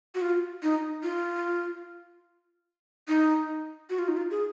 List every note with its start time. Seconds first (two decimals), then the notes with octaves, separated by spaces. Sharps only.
0.15 F#4
0.21 F4
0.63 D#4
1.03 F4
3.08 D#4
3.90 F#4
3.99 F4
4.08 D#4
4.17 F4
4.31 G#4